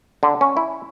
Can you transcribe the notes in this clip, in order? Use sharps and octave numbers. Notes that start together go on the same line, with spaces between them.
D3
C#4
E4